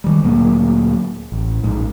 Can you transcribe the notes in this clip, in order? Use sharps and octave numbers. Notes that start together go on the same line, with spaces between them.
D#3 G3
D2 A#2 F#3 A#3
A1
A#1 G#2